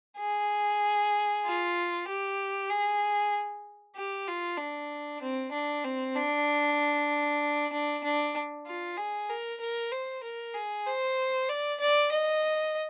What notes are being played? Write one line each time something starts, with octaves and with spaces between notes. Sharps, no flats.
G#4
F4
G4
G#4
G4
F4
D4
C4
D4
C4
D4
D4
D4
F4
G#4
A#4
A#4
C5
A#4
G#4
C5
D5
D5
D#5